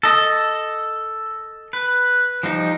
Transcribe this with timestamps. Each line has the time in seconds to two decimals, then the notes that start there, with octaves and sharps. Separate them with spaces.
0.03 A4 D#5
1.73 B4
2.43 F3 G3 D#4